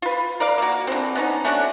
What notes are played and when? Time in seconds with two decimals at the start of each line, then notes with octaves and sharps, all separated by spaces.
0.02 F4 B4
0.40 A#4 D5 F5
0.58 A#3 F#4
0.87 D3 E3 C4
1.15 B3 C#4 D#4
1.45 A3 C#4 D4 F#4